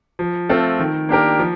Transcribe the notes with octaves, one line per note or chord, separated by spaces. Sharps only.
F3
A3 C4 F4 A4
D#3
A#3 D4 G4 A#4
F3